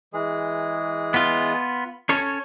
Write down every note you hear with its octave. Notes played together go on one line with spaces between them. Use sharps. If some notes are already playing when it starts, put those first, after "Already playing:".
E3 G#3 G#4
B3 F4
C#4 A4 C#5